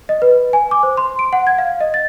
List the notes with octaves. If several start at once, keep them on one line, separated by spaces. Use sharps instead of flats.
D#5
B4
G#5
D6
C5
C6
D7
F#5
G#6
F5
D#5
A6